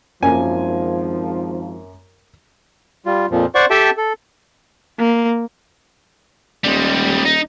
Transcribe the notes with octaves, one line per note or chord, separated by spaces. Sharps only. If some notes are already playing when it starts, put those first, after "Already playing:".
G#1 F#2 F3 A#3 A#4 G#5
G3 F4
F2 A#2 F3
C5 D5 F#5 C#6
G4 A4 E5 G5 A5
A4
A#3
D#1 G3 G#3
D#4